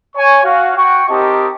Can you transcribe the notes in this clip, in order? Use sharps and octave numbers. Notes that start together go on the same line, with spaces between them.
C#5 G#5 C#6
F#4 F5
F#4 G5 C#6
C4 D#4 G4 A#4 D#5 A5